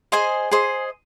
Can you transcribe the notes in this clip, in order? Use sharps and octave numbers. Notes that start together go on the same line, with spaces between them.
G#4 C5 D#5 G#5
G#4 C5 D#5